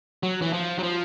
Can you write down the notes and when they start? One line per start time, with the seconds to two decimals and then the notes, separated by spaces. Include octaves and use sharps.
0.23 F#3
0.42 E3
0.53 F3
0.79 F#3
0.83 F3